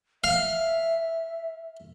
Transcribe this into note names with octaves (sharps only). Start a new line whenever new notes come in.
E5 F5